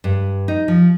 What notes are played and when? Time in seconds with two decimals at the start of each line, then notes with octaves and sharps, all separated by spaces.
0.04 G2
0.48 D#4
0.68 F3